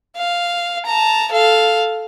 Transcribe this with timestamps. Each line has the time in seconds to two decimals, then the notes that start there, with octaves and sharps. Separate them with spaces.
0.17 F5
0.86 A5 A#5
1.32 A4 F5